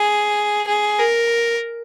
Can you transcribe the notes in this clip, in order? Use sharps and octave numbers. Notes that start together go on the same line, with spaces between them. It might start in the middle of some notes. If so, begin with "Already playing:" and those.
Already playing: G#4
G#4
A#4